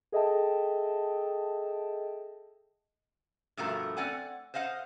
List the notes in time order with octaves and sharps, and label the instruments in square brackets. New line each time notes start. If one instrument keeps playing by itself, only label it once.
[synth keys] G#4 A4 D#5 E5 G5 A5
[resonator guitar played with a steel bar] G2 B2 F3 A3 F#4 A#4
C4 D5 F#5 G#5
C5 D#5 F5 F#5